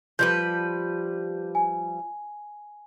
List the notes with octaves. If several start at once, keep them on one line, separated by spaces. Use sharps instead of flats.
F3 G3 B4 G6
G#5